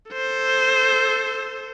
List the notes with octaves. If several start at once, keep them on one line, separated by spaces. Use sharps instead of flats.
A4 C5